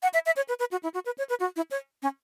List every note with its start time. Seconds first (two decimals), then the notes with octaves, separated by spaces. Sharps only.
0.03 F#5
0.14 E5
0.26 E5
0.36 C#5
0.49 B4
0.59 B4
0.71 F#4
0.83 E4
0.94 F#4
1.06 B4
1.18 C#5
1.30 B4
1.40 F#4
1.56 E4
1.71 C#5
2.02 C#4